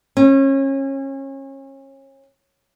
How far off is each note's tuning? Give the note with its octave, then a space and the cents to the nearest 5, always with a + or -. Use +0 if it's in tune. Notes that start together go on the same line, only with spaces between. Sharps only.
C#4 -30